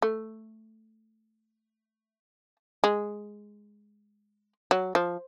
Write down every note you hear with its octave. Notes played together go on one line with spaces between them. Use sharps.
A3
G#3
F#3
F3